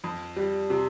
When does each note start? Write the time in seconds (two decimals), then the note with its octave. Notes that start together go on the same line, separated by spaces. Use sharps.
0.04 F2
0.36 G3
0.70 C3